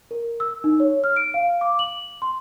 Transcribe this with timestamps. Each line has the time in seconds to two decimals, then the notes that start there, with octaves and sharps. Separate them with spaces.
0.11 A#4
0.40 E6
0.64 D#4
0.80 C#5
1.04 F6
1.16 D7
1.34 F5
1.61 D6
1.79 F#7
2.22 C6